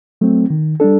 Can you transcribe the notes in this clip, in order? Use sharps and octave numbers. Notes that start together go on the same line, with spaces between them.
F#3 A3 C4
D#3
G3 D4 A4